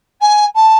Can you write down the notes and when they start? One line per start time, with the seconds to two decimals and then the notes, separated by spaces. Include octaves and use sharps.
0.21 G#5
0.55 A5